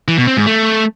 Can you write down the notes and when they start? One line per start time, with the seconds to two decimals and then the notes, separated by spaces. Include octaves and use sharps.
0.08 E3
0.18 B2
0.27 C4
0.37 G#2
0.47 A3